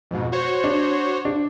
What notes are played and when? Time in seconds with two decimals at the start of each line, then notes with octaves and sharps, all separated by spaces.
0.11 F2 G#2 B2
0.32 F#4 C5 C#5
0.64 D4
1.25 D4